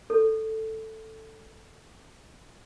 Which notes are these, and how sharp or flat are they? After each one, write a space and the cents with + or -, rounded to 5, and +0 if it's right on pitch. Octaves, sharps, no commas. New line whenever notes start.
A4 +5